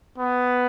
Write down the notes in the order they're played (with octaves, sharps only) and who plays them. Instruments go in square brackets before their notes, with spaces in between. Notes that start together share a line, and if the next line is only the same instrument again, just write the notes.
[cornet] B3